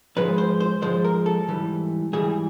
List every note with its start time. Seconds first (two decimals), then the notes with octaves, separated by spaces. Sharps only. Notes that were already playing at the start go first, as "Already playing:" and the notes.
0.16 G#2 F3 G#3 B4
0.38 C5
0.60 C5
0.82 G#2 F3 G#3 C5
1.04 A#4
1.26 A4
1.47 G#2 E3 G3
2.13 G#2 E3 G3 G#4